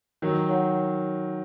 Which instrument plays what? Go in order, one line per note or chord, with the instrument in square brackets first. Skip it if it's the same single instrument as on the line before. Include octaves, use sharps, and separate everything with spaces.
[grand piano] D#3 F#3 [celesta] A#4
[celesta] C#5 F#5